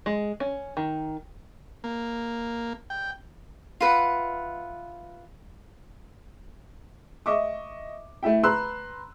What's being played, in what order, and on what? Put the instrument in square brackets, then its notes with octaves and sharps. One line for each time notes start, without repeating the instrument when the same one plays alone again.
[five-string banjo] G#3
C#4
D#3
[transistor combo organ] A#3
G5
[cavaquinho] F4 B4 E5 F#5
[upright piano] D#5 E5 C#6 D6
A3 E4 E5 G5
B4 A#5 C6 E6 F#6